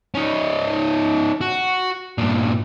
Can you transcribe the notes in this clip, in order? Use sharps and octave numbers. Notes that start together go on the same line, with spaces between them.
C#4 D#4
F#4
G2 A#2